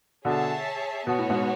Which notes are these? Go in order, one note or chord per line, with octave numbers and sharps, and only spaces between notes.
B2 D3 G#4 C#5 E5 A5
B2 B3 F#4 C#5
A2
G#2 B2